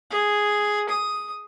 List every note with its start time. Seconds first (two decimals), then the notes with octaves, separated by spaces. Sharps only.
0.10 G#4
0.89 D#6